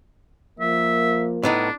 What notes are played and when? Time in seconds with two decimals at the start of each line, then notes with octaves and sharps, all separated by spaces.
0.60 F3 A#3 E5
1.43 A2 B3 D4 D#4